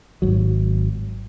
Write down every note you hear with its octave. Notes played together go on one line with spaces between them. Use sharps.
G#1 F#3